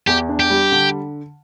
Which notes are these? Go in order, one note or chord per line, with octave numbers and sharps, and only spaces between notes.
E2 G4
D4
G4
G3
D3